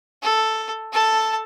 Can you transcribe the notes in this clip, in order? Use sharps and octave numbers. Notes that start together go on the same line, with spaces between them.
A4
A4 A5